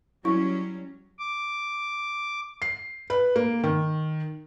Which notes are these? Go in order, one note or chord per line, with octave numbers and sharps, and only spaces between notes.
F#3 G3 C#4 E4 C#6
D6
C7
B4
A#3
D#3